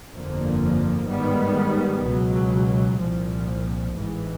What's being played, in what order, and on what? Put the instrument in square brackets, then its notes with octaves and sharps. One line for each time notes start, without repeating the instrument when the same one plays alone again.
[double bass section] G1 F2 D3 F3 A#3
G#2 D#3 G3 B3
C#2 B2 F#3
C2 A#2 F3
A1 G#2 E3